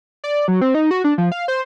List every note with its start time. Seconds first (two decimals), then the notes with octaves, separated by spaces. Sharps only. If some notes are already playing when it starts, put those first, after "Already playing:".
0.24 D5
0.48 F#3
0.61 C4
0.75 D#4
0.91 F#4
1.04 D4
1.18 F3
1.32 F5
1.48 C5